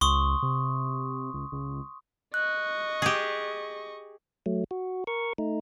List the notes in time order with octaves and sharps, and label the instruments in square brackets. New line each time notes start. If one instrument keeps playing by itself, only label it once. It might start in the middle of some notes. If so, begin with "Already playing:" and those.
[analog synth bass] C#2 [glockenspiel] C6 C#6 D#6
[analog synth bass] C3
C#2
C#2
[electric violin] D#5 C#6 [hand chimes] F#6
[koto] G4 G#4
[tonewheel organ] F#3 A3
F#4
A#4 C#6
A3 D#4